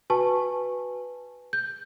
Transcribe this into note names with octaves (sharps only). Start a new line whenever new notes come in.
F#4 B4 G#5 A5 C#6
G6